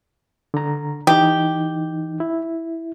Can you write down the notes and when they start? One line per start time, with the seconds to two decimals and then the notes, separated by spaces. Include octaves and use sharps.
0.54 D3 A#5
1.07 E3 D#4 G4
2.20 E4